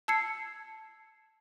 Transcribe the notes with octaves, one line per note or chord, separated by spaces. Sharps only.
A5 E6 G#6 C7 C#7